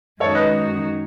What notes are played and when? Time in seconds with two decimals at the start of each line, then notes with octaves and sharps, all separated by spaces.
0.20 F#2 D#3 G#3 D#4 F#4 A4 C#5
0.35 B4 D#5